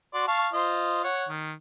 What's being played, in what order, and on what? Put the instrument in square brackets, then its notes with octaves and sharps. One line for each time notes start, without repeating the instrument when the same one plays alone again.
[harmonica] F#4 D5 C6
F5 A5 C#6
F4 C5 D#5
C#5 F#5
D#3